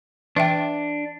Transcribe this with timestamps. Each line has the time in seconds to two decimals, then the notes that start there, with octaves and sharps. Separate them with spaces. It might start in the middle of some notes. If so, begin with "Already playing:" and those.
0.36 E3 D4 E5 G5